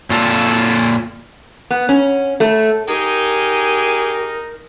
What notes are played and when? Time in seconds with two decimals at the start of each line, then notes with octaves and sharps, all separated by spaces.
0.10 A#2 F4 A4
1.70 B3
1.89 C#4
2.40 A3
2.88 D#4 G4 G#4 A#4